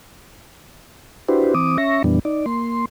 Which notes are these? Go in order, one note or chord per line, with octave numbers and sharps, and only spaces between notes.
D4 E4 F#4 G4 B4 C5
E3 C4 D6 D#6
C#4 E5 C#6 A#6
F2 A#2 E3 G3 B3 D4
D#4 D5
A#3 C6